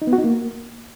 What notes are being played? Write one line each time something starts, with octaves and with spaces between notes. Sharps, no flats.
D#4
B3
F#4
D#4
A#3